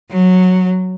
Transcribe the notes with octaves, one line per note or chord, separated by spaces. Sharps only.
F#3